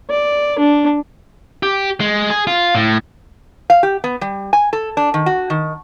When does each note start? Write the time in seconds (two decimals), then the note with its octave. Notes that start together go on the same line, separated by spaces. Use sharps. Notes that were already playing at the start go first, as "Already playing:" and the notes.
0.10 D5
0.59 D4
1.63 G4
2.00 G#3
2.30 G#4
2.47 F4
2.75 A2
3.70 F5
3.83 G4
4.04 B3
4.21 G3
4.53 G#5
4.73 A4
4.97 D4
5.14 D#3
5.26 F#4
5.50 D#3